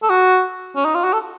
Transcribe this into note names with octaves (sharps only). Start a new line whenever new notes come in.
A4
F#4
C#4
D#4
F4
F#4
A4